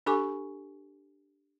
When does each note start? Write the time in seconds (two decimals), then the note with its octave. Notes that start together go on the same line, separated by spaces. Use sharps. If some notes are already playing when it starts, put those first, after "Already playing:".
0.06 D4 G4 A4 G#5 C#6 D6